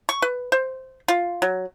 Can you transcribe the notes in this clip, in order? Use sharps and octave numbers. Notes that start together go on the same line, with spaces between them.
C#6
B4
C5
F4
F#3